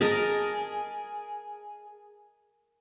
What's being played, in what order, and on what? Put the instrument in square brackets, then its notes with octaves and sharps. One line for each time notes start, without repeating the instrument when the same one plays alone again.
[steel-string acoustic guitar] G#4 [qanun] A#4 D#5 A5